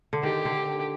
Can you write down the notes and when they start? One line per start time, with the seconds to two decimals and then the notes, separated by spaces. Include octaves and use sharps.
0.13 D3
0.23 D#3 G4
0.45 D3